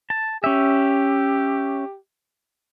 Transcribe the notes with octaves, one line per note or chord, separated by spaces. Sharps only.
A5
C#4 G4 E5